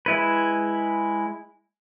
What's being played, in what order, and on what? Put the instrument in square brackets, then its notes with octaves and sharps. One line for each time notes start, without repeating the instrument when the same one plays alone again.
[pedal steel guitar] G#3 E4 B4